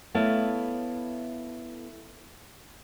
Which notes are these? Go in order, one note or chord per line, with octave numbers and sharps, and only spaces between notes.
A3 B3 E4 A4 C#5 F5